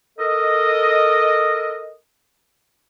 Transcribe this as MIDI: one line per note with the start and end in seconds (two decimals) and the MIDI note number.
0.18 1.95 69
0.18 1.95 70
0.18 1.95 75